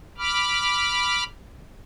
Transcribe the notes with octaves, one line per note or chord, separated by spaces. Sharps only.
B5 D6 F6